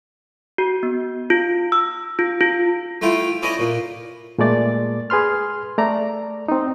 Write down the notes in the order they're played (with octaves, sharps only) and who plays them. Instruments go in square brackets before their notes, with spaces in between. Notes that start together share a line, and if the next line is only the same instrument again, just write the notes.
[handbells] F#4
B3
F4
E6
F4
F4
[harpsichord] A3 E4 F4 G5
C#4 E4 D5 D#5
A#2
[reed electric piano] A#2 G#3 A3 D5 A6
G#4 B4 C6 F6
A3 D5 A#5
C4 D#4